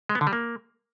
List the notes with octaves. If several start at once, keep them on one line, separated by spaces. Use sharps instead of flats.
G#3
B3
D3
G3
A#3